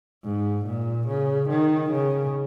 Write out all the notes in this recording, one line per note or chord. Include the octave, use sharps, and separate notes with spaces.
G#2
A#2
C#3
D#3
C#3